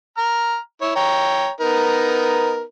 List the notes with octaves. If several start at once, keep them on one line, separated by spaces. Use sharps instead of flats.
A#5 F6
E4 C#5
C#5 G5 A#5
B3 D#4 A#4